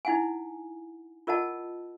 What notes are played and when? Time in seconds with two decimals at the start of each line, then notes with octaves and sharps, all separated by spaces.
0.05 D#4 E4 F#5 G#5
1.27 F4 A#4 D#5 F#5 A5